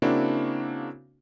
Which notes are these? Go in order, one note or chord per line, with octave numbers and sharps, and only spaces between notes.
C#3 A#3 C4 D4 E4 F#4